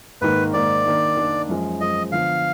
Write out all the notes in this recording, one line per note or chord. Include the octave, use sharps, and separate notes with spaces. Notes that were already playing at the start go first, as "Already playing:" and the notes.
G#2 D#3 A#3 B4
G#2 D#3 A#3 D5
D#3 A#3 D4
D#3 A#3 D4
F#2 F3 G#3
F#2 F3 G#3 D#5
D3 F3 B3 F5